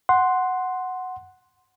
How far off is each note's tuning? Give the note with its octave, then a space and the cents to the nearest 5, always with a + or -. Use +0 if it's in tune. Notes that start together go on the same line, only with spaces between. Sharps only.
F#5 +0 C6 +0